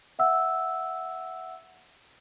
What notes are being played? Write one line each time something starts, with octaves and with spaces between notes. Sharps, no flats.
E5 F#5 E6